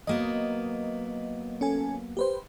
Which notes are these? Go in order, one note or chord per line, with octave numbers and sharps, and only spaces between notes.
F#3 A#3 B3 D#5
C#4 A4 G#5
G4 B4 C5